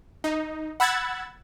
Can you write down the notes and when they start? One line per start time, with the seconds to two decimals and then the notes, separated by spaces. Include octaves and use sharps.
0.24 D#4
0.80 F#5 B5 E6 F#6 G#6 A6